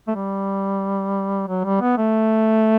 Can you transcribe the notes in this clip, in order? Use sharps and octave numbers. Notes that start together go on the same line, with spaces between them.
A3
G3
F#3
G3
B3
A3